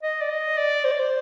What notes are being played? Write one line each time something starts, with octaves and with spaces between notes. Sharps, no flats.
D#5
D5
D#5
D5
C5
D5
C5